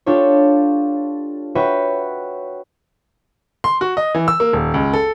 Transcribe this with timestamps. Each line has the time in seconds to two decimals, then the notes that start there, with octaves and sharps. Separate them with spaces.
0.06 D4 F4 G4 A4 C#5
1.55 F#4 B4 C#5 E5 G5
3.64 C6
3.81 F#4
3.97 D#5
4.15 E3
4.28 E6
4.40 A#3
4.53 D#1
4.74 C#2
4.94 A4